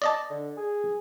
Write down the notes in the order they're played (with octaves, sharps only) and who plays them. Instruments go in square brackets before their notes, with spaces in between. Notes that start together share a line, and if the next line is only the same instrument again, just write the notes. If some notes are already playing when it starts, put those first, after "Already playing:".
[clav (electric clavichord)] D5 D#5 A5
[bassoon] D3
G#4